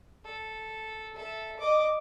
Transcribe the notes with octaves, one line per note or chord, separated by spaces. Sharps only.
A4
A4 E5
D#5 D6